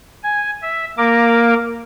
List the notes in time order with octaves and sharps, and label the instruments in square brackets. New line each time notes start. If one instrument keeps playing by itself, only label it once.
[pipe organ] G#5
E5
A#3 A#4 D6